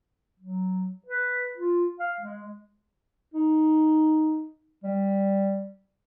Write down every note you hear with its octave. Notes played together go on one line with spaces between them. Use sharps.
F#3
B4
F4
F5
G#3
D#4
G3